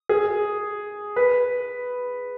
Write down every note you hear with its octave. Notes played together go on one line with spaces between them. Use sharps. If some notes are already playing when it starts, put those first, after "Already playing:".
G#4
B4